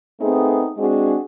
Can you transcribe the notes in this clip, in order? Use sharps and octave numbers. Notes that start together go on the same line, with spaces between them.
A3 B3 C4 D#4 G#4
G#3 C4 D4 F#4 G#4